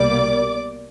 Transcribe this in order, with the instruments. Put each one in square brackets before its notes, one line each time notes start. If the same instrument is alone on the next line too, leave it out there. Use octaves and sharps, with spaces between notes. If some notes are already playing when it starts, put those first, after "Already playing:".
Already playing: [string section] C2 B2 G3 A#3 D5 D6